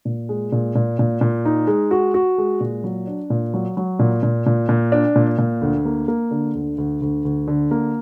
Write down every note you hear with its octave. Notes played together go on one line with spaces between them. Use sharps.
A#2
G#3
A#2
A#2
A#2
A#2
D#4
G#3
F#4
F#4
G#3
A#2
F#3
D4
A#2
F#3
F#3
A#2
A#2
A#2
A#2
D4
A#2
A#2
D2
A#3
A#3
D3
D2
D2
D2
D2
D3
A#3